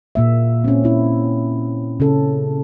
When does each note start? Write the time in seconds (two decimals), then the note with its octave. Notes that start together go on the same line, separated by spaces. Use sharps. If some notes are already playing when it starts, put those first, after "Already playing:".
0.15 A#2 A#3 E5
0.64 C4 C#4
0.83 C4 E4
2.00 C#3 C#4 A4